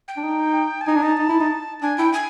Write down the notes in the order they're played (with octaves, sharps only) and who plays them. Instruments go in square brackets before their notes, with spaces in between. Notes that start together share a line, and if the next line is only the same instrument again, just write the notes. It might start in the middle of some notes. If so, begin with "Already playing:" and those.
[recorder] G5
[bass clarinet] D4
D#4
[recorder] A5
[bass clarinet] D#4 [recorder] G#5
[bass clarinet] D4
[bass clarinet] D#4 [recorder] A5
[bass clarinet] D#4
E4
D#4
[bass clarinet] D4 [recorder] G#5
[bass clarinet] E4 [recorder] G5
[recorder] G#5